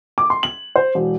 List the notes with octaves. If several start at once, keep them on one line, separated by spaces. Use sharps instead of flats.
D6
C6
F#7
C5
E1